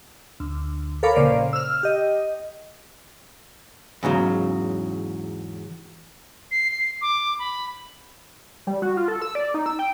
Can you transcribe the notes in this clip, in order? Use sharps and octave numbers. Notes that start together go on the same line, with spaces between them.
D2
A4 A#4 C#5 F5 B5 D6
A#1 A#2 C#3 C5 D5 F5
E6 F6
G4 D#5
E2 G#2 C#3 F#3
C7
C7
D6
B5
G3
F#4
F4
A4
E6
D5
D#4
E6
G5